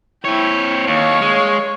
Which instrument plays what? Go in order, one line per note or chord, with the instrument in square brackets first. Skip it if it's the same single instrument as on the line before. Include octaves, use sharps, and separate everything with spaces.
[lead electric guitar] C4 C#5 [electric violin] E4 G5
[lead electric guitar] D#2 [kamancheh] C#5 [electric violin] F5 C#6
[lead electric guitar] G#3